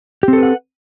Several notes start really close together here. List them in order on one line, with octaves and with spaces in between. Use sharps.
G4 C4 A4 B4 F#5